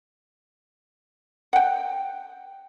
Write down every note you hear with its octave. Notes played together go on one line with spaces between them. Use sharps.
F#5 G5